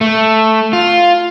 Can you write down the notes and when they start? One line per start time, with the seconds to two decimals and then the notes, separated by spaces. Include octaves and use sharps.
0.01 A3
0.73 F4